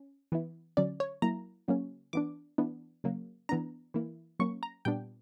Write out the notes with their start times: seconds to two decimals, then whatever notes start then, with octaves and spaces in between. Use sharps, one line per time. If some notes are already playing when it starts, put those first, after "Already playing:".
Already playing: C#4
0.32 E3 B3 E4
0.77 D3 F#3 C#4 D5
1.00 C#5
1.22 F#3 A#3 E4 A#5
1.68 C#3 F#3 A#3 C#4
2.13 E3 B3 D4 D6
2.58 E3 B3 D4
3.04 C#3 F#3 A#3
3.49 E3 B3 D4 A#5
3.94 E3 A#3 E4
4.40 F#3 A#3 C#4 C#6
4.63 A#5
4.85 A#2 G3 B3 D4 G5